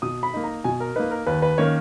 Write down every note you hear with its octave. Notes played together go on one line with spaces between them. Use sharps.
B2 D#6
B5
A#3 D#4
A#5
B2 G#5
A#4
A#3 D#4 B4
A#4
D#2 B4
B4
D#3 A#3 C#4 C#5